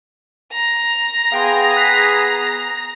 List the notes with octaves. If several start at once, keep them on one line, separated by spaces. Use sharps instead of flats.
A#5
B3 G#4 F5 G5 C6
F#6 B6 C7